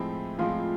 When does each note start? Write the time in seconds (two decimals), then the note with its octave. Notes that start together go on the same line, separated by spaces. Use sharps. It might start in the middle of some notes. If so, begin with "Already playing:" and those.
Already playing: A2 F3 G#3 C4 E4
0.39 A2 F3 G#3 C4 F4